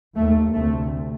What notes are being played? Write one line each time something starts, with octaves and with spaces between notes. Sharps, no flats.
D#2 A3
D2 C3 A3